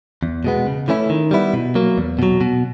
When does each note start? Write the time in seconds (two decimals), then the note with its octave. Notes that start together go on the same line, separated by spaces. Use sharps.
0.23 E2
0.44 B2 G#3 B3
0.67 C#3
0.88 E3 A3 C#4 E4
1.10 D#3
1.31 G3 B3 E4
1.54 B2
1.75 F#3 A#3
1.98 E2
2.19 B2 F#3
2.41 B2